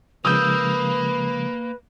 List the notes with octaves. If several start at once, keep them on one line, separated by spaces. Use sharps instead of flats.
C#3 F3 G#3 A#3 B4 D#6 E6 G6